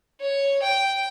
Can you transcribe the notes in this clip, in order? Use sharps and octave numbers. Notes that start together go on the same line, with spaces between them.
C#5
G5